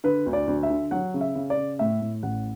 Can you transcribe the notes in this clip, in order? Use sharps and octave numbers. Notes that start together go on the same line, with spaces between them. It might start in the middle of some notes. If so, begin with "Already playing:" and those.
D3 B4
D2
D5
D2
E5
D3
F#3 F#5
C#3
E5
C#3
D5
C#3
A2 E5
A2
A1 F#5